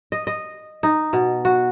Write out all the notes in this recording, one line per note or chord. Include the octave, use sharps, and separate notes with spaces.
D#5
D#5
D#4
B2
F#4